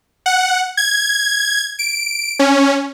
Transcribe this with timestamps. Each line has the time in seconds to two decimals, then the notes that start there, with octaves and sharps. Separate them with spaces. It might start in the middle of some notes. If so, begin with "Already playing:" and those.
0.26 F#5
0.77 G#6
1.79 D7
2.39 C#4